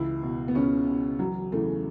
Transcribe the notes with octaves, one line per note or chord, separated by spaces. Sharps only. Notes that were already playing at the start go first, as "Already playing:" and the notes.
Already playing: C#2 E3 E4
B2
B3
C#2 C#3 C#4
B2
E1 F#3
E2 C#3 E3 A3